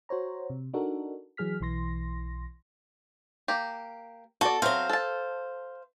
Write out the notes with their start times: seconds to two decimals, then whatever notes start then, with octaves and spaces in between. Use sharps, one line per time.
0.09 F#4 C5 C#5 A#5
0.50 C3
0.74 D4 D#4 F#4 A4 A#4
1.37 E3 F#3 G#4 F6 B6
1.61 B1 E3 C6 A#6
3.48 A#3 G4
4.41 F#4 A4 D5
4.62 F#3 C4 C5 F5
4.89 A4 A5